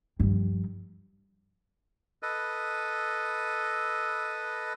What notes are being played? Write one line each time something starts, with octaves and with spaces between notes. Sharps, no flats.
G2 F3
A4 B4 D#5